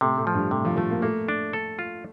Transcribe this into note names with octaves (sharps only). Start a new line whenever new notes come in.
A2 C3
A2
F3
G2
A2 C3
F3
F3 A3
A#3
A3 A#3
D4
A4
F4